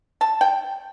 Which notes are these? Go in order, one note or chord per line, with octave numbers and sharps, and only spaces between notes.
A5
G5